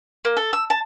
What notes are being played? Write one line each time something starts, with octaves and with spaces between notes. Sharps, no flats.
A#3
A4
E6
A5